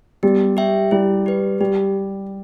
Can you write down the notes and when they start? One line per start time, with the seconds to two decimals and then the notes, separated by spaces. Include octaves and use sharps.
0.23 G3 B3
0.57 G4 E5 G5
0.91 G3 E4
1.26 G4 B4
1.60 G3 G4